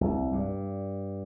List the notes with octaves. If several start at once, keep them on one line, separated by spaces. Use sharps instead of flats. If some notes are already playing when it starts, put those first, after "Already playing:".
C2
G2